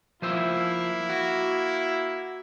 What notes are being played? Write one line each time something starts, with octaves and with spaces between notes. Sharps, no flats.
F3 A#3 E4 C5 E5
F#4